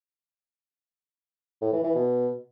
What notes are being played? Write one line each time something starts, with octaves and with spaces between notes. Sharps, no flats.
A2
E3
E3
B2